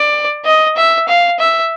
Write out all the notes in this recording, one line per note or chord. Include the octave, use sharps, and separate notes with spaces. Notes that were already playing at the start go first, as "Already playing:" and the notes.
Already playing: D5
D#5
E5
F5
E5